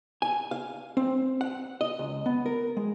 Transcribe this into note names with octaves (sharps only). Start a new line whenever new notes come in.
G#5
F5
C4
F#5
D#5
C#2
B3
A#4
G#3